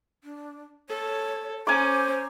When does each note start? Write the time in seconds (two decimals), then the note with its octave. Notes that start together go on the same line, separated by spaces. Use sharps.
0.24 D4
0.89 A4 C#5
1.67 C#4 C5 G#5 A#5 D6